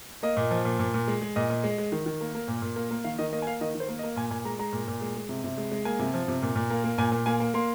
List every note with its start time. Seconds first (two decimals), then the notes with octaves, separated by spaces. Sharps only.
0.23 A#3 D#5
0.37 A#2
0.51 F3
0.65 A#2
0.79 A#2
0.94 A#2
1.08 G#3
1.21 G#3
1.36 A#2 D#5
1.50 A#2
1.64 G#3
1.78 G#3
1.92 D#3
2.06 D#3
2.21 A#3
2.35 A#3
2.48 A#2
2.62 A#2
2.76 A#3
2.91 A#3
3.04 D#3 F5
3.18 D#3 D#5
3.32 A#3 D#5
3.42 G#5
3.47 A#3 F5
3.61 D#3 D#5
3.75 D#3
3.80 C5
3.88 A#3
3.99 D#5
4.03 A#3
4.16 A#2 G#5
4.31 A#2 G#5
4.45 G#3 A#5
4.59 G#3 A#5
4.73 A#2
4.88 A#2
5.01 G#3
5.16 G#3
5.29 C3
5.44 C3
5.58 G#3
5.71 G#3
5.85 A#3 G#5
5.99 C3
6.14 F3
6.28 C3
6.42 A#2
6.56 A#2
6.70 A#3
6.84 A#3
6.98 A#2 G#5
7.12 A#2
7.26 A#3 G#5
7.40 A#3
7.54 A#3 C6